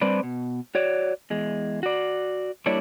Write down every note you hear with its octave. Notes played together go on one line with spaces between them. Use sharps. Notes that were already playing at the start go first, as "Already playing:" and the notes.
G3 C4 D4 B4 C5 D5
B2
F#4 C#5 D5
E2 G#3
F#4 D5
G3 A#3 D4 E4 C#5 D5